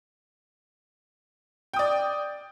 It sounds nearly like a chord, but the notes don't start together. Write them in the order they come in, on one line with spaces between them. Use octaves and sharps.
G5 D#6 D5